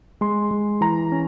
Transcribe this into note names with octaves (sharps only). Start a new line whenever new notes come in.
G#3 C6
G#3
E3 A#5
C#4